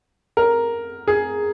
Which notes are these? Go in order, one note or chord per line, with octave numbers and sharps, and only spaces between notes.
A#4
G#4